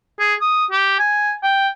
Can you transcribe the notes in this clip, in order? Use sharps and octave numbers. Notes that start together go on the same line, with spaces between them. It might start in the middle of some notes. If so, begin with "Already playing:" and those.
G#4
D#6
G4
G#5
G5